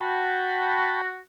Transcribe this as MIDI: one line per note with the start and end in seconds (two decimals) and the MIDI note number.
0.01 1.17 66
0.01 1.02 79
0.01 1.02 81
0.01 1.02 83